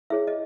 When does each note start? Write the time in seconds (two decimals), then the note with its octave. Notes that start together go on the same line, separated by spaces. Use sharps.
0.10 E4 G#4 C#5 E5
0.27 D#5